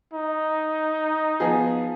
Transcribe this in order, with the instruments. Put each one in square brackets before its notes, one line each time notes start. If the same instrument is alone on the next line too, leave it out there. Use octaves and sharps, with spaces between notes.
[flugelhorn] D#4
[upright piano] F3 B3 G#4